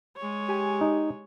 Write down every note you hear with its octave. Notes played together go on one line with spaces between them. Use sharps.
G#3 C#5
G4 G#5
D#4